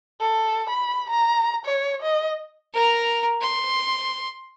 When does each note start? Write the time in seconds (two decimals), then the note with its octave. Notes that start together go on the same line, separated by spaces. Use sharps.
0.21 A4
0.70 B5
1.10 A#5
1.65 C#5
2.02 D#5
2.73 A#4 A#5
3.41 C6